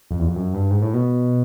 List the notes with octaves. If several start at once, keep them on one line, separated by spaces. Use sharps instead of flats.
F2
E2
F2
F#2
G2
G#2
A2
B2